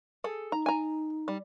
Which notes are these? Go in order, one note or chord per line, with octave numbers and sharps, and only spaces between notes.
G#4 A4
D#4 A#5
G#5 A#5
G3